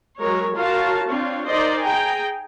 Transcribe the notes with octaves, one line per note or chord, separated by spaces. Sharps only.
F#3 G#3 A#4 C#5
F4 F#4 A#4 C#5 F5 A5
C4 D4 F4 C#5
D#4 A#4 C5 D5 D#5
G#4 G5 G#5 A#5